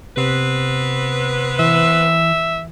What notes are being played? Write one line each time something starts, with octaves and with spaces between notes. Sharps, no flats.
C3 B3 C4 B4
E3 E5